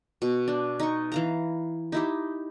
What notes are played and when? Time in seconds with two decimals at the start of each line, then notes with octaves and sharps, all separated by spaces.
0.22 B2
0.48 D4
0.80 D#4 C#6
1.12 E3 F5 A#5
1.92 D#4 E4 G4